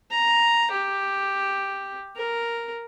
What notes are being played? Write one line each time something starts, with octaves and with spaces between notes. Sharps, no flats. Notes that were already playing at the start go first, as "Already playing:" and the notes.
A#5
G4
A#4